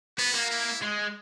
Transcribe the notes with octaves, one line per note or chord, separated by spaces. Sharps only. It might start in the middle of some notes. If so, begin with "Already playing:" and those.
B3 F#4
A#3
E4
G#3